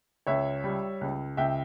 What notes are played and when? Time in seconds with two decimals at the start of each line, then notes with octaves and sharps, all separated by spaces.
0.27 C#2 C#5 E5
0.64 G3
1.01 C#2
1.37 C#2 E5 G5